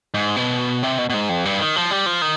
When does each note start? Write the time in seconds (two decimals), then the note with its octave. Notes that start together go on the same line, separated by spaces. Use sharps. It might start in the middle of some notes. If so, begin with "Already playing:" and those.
0.14 G#2
0.36 B2
0.83 C3
0.98 B2
1.10 B2
1.14 G#2
1.29 F2
1.45 G2
1.60 D#3
1.76 F3
1.91 G3
2.06 F3
2.22 D#3